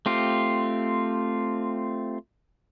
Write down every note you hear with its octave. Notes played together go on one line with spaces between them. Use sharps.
A3 C4 F4 G4